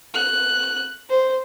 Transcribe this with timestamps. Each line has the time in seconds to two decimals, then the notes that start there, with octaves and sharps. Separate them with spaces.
0.14 F#6
1.09 C5